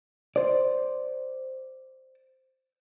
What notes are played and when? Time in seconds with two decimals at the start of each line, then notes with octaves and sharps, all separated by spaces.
0.36 C5 D5